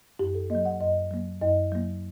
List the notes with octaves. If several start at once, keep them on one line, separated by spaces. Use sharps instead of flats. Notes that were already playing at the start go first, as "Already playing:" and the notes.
F#2 G4
A4
F#3 A#3 D#5
F#5
F#2 D#5
F#3 A#3
F#2 D#5
F#3 A#3